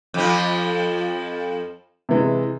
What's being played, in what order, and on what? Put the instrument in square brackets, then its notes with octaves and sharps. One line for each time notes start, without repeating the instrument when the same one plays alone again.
[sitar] F2 F3
[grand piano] C3 E3 G#3